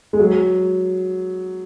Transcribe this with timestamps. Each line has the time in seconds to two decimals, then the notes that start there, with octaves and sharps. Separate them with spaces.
0.13 G#3
0.20 F#3